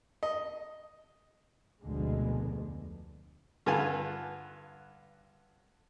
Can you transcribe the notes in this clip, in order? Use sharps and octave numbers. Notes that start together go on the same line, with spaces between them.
D#5
F1 D2 B2 D3 G#3
G2 D3 F4 B4 G#5 A5